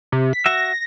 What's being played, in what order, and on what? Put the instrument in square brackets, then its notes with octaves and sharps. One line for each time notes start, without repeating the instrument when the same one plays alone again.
[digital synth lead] C3
B6
[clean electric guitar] F#4 E5 [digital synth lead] A#6